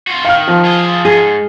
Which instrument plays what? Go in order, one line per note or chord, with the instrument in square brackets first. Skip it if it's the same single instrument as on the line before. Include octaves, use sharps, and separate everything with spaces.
[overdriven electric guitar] F4 F#4
[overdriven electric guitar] D#3 [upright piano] F5 F6
[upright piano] F3
[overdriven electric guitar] F4 G#4
[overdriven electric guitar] G#2 [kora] G#4